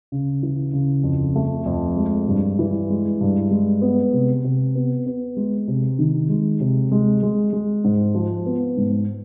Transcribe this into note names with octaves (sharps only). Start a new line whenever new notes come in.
C#3
E3
C#3
F2
A3
F2
G#3
G2
E3
G#3
G2
G#3
B3
C3
C3
B3
B3
G#3
C3
D#3
G#3
C3
G#3
G#3
G#3
G#2
F3
B3
G#2